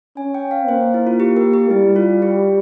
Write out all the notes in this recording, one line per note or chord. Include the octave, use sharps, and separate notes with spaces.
C#4 G#5
G5
F5
A#3 C5
E4
F4
G4
A#4
G4
G3 E4
F4
G4